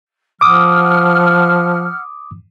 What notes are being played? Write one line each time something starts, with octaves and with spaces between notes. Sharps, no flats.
F3 F#5 D6 D#6 F6